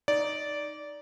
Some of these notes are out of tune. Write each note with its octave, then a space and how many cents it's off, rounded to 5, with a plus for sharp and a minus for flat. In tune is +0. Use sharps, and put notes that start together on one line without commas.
D#4 +0 D5 -15